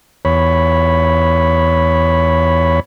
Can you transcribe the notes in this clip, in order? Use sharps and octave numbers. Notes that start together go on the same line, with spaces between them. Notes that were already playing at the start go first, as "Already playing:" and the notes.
E2 C#5 B5